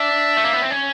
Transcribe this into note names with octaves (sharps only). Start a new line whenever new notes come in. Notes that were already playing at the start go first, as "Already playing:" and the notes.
Already playing: D4 E5
A3
A#3
B3
C4
C#4